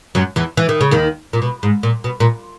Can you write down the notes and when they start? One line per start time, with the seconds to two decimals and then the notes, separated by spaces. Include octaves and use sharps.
0.15 F#2 F#3
0.36 E2 E3
0.57 E3
0.69 D#3
0.81 C#3
0.91 D#2 D#3
1.33 A#2
1.42 B2
1.63 G#2
1.83 A#2
2.04 B2
2.20 A#2